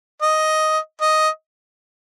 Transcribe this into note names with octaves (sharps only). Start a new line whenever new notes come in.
D#5
D#5